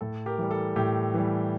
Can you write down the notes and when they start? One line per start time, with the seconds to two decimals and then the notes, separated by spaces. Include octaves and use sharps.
0.01 A2 A4
0.26 G4 A#4
0.38 E3 G3
0.51 A4
0.76 A2 G4
1.14 E3 G3